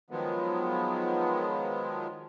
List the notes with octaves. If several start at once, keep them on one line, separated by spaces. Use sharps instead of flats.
D#3 F3 F#3 G#3 B3